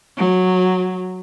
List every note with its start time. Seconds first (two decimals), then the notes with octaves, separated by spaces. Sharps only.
0.17 F#3